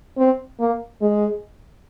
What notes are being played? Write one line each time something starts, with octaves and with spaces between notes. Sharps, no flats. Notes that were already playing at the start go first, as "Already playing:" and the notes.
C4
A#3
G#3